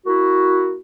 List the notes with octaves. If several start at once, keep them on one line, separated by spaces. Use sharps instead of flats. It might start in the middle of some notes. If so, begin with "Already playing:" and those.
A#3 E4 F#4